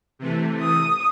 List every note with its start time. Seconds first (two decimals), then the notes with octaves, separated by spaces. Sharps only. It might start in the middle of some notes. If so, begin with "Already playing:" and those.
0.19 C3 E3 A3
0.61 D#6